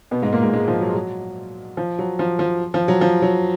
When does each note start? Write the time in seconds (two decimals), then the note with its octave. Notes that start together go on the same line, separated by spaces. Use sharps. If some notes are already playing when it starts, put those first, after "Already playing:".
0.11 B2 B3
0.22 G#2 G#3
0.33 A#2 A#3
0.43 G#2 G#3
0.53 G#2 G#3
0.68 F3
0.81 F#3
0.95 F#3
1.77 F3
1.99 F#3
2.19 F3
2.39 F3
2.74 F3
2.88 F#3
3.01 F3
3.22 F#3